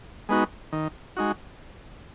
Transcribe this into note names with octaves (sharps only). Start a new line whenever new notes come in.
G#3 B3 D#4 F#4
D#3
G#3 D#4 F#4